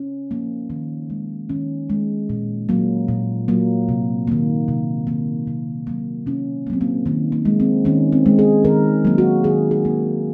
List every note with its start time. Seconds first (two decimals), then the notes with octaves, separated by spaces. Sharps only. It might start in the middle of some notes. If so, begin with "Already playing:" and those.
Already playing: C#4
0.31 F3 A#3
0.70 D#3
1.10 G#3
1.49 D#3 C#4
1.90 G#3
2.30 A#2
2.69 F#3 A#3
3.08 A#2
3.48 F#3 A#3
3.89 C3
4.27 D#3 A#3
4.68 C3
5.07 D#3 A#3
5.47 C3
5.87 F#3 A#3
6.26 C3 C#4
6.67 A#3
6.70 F#3 C4
6.81 A#3
7.06 D#3 A#3
7.32 A#3
7.45 G#3
7.60 C4
7.85 D#3 C#4
8.12 C4
8.26 G#3
8.39 G#4
8.65 D#3 A#4
9.05 F#3 A#3
9.18 F#4
9.44 D#3 G#4
9.71 G#4
9.85 F#3 A#3